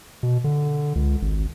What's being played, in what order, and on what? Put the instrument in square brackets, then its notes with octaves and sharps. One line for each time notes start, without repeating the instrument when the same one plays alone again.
[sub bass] B2
D3
C#2
G#1